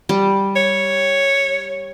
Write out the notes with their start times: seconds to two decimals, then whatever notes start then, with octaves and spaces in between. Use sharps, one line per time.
0.09 G3
0.56 C#5